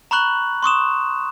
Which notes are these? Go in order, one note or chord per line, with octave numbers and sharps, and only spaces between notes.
A#5 B5 C#6 F#6 F#7
C6 C#6 D#6 E7